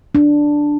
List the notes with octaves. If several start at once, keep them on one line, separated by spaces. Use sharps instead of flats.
D4